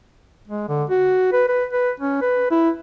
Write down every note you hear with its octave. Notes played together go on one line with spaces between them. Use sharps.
G#3
D3
F#4
B4
B4
B4
C#4
B4
E4